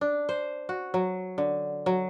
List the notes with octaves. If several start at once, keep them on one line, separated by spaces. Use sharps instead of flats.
D4
C5
F#4
F#3
D3
F#3